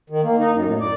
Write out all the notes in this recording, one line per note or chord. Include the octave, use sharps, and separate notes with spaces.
D#3
A#3
D#4
F#2
A2
D5